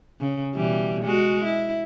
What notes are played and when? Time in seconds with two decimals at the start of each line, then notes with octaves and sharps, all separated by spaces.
0.21 C#3
0.55 B2 E3 G3
1.04 G#3 F#4
1.44 E4